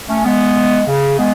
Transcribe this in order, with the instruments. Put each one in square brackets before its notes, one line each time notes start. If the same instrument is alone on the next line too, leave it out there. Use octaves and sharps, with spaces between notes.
[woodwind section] A3 C#4
G#3 B3
C#3
G#3 B3